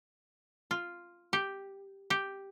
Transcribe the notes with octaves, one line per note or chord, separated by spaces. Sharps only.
F4
G4
G4